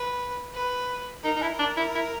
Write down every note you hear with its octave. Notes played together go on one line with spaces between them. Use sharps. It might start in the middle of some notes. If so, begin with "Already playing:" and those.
Already playing: B4
B4
D#4 A#4
D#4
E4
D4
E4
E4